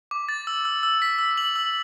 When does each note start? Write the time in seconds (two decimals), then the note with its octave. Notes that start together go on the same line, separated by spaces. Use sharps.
0.11 D6
0.29 A6
0.47 E6
0.65 E6
0.83 E6
1.02 B6
1.19 E6
1.38 F#7
1.56 E6